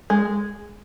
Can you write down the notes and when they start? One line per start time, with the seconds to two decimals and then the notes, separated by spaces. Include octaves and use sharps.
0.10 G#3